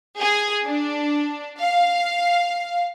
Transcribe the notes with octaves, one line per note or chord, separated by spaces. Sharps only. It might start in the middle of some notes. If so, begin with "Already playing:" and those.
G#4
D4
F5